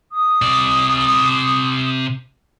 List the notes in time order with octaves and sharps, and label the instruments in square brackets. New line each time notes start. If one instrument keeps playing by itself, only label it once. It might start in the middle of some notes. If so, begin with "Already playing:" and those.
[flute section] D#6
[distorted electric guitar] C3 D5